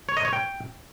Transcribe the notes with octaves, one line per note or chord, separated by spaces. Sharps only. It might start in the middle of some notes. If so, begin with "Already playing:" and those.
C#5
D#5
C#5
G5